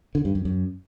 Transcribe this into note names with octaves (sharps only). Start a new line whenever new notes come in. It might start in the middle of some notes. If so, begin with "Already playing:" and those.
D3
G2
F#2
F#2